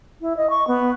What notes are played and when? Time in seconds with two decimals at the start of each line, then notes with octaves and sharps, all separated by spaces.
0.21 E4
0.37 D#5
0.50 C#6
0.67 B3